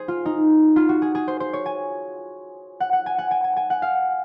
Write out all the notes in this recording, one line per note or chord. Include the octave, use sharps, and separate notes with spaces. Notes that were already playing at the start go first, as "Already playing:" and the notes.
Already playing: G#4 C5
F4
D#4
F4
F#4
G#4
G#4
C5
C5
C#5
G#5
F#5
F#5
G#5
F#5
G#5
G#5
G#5
F#5
F5